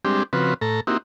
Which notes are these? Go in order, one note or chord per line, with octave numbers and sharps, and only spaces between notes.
G3 G#3 C4 D4 G4
C#3 F3 C4 F#4 B4
A2 A4 A#5
A#3 C4 D#4 E4 F#4 G4